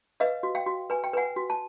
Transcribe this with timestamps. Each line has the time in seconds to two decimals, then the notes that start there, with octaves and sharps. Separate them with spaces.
0.20 B4 D#5 F5
0.43 F#4
0.55 F5 G5
0.66 F#4
0.90 B4 G#5
1.04 G5
1.13 B4 F#5 G#5
1.36 F#4
1.50 A5